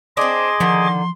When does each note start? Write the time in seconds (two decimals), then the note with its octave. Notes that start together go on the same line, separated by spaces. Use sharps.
0.17 C4 D4 G#4 D#5 C6 D6
0.60 D3 D#3 F3